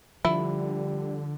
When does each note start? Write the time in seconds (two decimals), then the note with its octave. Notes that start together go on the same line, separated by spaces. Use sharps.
0.25 D3 F3 G3 E4